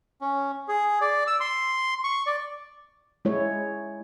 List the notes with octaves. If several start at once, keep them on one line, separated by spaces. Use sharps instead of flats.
C#4
G#4
D5
E6
C6
C#6
D5
G#3 E4 C#5